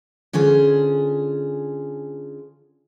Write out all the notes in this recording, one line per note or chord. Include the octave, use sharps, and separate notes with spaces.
D3 C#4 F4 G#4 C5